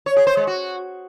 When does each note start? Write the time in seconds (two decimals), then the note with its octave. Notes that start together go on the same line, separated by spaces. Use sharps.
0.06 C#5
0.16 G#4
0.27 C5
0.37 G#3
0.47 F#4